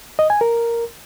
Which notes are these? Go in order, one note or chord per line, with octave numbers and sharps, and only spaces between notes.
D#5
G#5
A#4